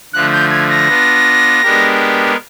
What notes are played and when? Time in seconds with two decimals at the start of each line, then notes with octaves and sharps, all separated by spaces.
0.13 D3 F3 A3 F#6
0.32 G6
0.50 G#6
0.69 A#6
0.87 B3 D4 F4
1.62 G#3 B3 D4 G4 A#4